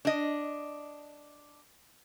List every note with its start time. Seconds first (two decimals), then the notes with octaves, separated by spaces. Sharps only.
0.05 D4 D#5